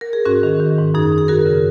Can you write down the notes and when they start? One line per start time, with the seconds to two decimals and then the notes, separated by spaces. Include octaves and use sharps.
0.01 A#4
0.13 G#4
0.25 G#2 C#4 F#4
0.43 D#3
0.60 D#3
0.78 G#2
0.94 F#2 D#4 G#4
1.11 F#2
1.18 G#4
1.28 F#2 F#4 A#4
1.46 C#3